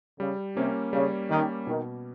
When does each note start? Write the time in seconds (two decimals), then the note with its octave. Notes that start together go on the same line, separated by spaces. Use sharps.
0.20 C#3 G3
0.56 C3 A#3 C#4
0.93 C#3 G3
1.30 D#3 A#3 C#4
1.67 B2 D#3